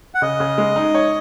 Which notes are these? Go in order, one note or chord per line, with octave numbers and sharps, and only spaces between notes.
F#5
C#3 D#5
C#3
G#3
D#4
C#5